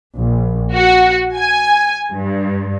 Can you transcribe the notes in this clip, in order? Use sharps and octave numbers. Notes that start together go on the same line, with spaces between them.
A#1
F#4
G#5
G2